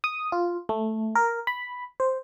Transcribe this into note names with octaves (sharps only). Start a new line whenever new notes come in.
D#6
F4
A3
A#4
B5
C5